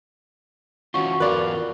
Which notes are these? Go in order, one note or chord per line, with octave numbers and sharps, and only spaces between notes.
E3 C#4 F4 F#4 F#5 C#6
E2 F4 A#4 B4 D5